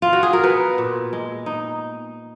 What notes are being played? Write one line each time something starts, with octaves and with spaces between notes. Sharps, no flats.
F4
F#4
G#4
A#4
B3 B4
A#2
G#3
D#4